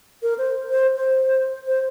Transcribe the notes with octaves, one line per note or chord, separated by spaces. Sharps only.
A#4
C5
C5
C5
C5